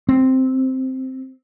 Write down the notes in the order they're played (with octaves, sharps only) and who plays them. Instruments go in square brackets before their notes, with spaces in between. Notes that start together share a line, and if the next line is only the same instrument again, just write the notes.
[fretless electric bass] C4